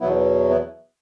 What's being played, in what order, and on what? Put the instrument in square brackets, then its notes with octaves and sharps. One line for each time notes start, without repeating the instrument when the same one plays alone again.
[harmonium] E2 B2 F#3 B3 E4
B3 E4